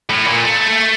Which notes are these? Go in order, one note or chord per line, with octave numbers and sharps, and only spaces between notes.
A2
A#2
A3